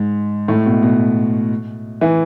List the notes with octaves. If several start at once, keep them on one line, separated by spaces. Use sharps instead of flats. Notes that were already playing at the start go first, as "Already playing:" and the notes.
Already playing: G#2
A2
B2
B2
E3